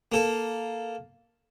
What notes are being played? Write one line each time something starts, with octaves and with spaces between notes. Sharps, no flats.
A#3 A4